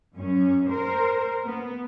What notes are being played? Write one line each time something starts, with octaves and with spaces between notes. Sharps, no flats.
F#2 C#4
A#4 C5
B3